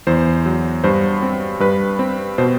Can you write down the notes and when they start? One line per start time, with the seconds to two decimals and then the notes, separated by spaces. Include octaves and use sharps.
0.07 E2 C5
0.46 F#3
0.84 G2 C5
1.22 C4
1.60 G2 B4
1.99 C4
2.38 B2 C5